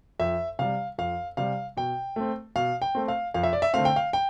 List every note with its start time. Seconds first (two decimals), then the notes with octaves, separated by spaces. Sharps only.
0.20 F2 E5
0.59 C3 G3 F5
0.98 F2 F5
1.37 C3 G3 F5
1.77 B2 G5
2.16 A3 C4
2.56 B2 F5
2.82 G5
2.95 A3 C4
3.08 F5
3.34 F2 F5
3.43 E5
3.53 D5
3.62 E5
3.74 D3 A3 C4 F5
3.85 G5
3.96 F5
4.13 G5